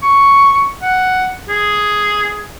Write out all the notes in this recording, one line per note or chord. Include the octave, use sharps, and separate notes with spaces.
C#6
F#5
G#4